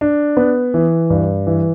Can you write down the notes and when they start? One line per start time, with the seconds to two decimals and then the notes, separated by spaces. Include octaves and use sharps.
0.01 D4
0.37 B3
0.74 E3
1.10 G2
1.47 E3